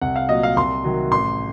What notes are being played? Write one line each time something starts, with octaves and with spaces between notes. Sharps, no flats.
C2 F#5
F5
A#2 F#3 D#5
F5
C2 C6
C3 D#3 F#3
A1 C6